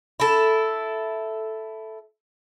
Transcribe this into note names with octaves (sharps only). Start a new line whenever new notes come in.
E4 A4